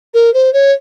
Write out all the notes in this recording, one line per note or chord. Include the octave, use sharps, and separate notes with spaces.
A#4
C5
C#5